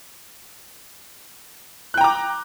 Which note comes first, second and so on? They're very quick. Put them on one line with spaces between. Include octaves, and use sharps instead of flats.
F#6 G5 A#5 D6